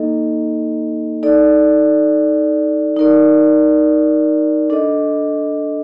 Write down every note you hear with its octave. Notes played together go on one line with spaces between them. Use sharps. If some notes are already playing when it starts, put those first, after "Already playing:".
Already playing: A#3 D#4 A4 D#5
D#4 A4 D5
D#4 A#4 D5
D4 A4 D#5